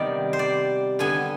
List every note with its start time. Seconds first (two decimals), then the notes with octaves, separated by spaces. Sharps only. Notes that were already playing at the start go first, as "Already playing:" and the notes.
Already playing: C3 D#3 G3 B3 D5
0.33 C5
0.39 D5
0.99 D3 G3 B3 G#5